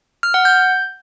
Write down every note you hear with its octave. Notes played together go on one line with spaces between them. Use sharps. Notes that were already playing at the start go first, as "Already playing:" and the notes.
F6
F#5
G6